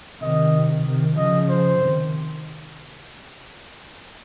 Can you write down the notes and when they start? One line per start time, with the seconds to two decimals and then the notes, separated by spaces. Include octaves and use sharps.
0.22 C3 D#3 D#5
0.85 C3 D#3
1.17 C#3 F3 D#5
1.50 C5
1.81 C3 D#3